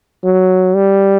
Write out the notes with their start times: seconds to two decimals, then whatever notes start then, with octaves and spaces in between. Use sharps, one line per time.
0.24 F#3
0.75 G3